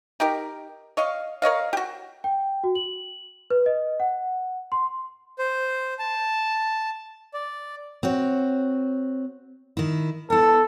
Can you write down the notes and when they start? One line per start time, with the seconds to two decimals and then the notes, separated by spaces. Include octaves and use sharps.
0.20 D#4 G4 A#4
0.97 C#5 D#5 F5
1.42 A#4 C#5 D#5 F5
1.73 F#4 G4
2.24 G5
2.64 F#4
2.75 F#7
3.50 B4
3.66 D#5
4.00 F#5
4.72 C6
5.39 C5
5.99 A5
7.34 D5
8.03 C4 F#4 C#5
9.77 D#3 E4
10.30 B3 E4 A4